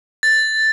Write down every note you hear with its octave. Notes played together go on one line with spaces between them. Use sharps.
A6